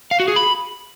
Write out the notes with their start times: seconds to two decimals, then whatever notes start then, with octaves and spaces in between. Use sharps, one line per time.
0.11 F5
0.20 F#4
0.28 G#4
0.36 B5